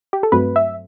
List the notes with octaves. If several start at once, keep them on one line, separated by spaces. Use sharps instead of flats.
G4
A4
G2 F#3 A3 C4 B4
E5